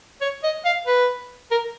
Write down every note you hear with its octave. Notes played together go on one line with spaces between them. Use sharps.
C#5
D#5
F5
B4
A#4